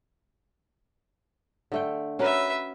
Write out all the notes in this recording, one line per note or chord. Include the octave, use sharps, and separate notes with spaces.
D3 A3 G5
C#4 F#4 A#4 B4 E5